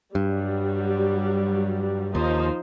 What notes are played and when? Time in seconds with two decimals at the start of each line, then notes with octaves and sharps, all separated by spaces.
0.15 G2 F#3 G3
2.15 D#2 F3 D#4 C5